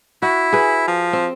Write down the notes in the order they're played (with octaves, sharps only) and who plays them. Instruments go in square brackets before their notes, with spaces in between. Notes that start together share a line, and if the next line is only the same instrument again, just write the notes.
[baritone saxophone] E4 [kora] F#4
[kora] G#4 B4
[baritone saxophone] F3
[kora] C4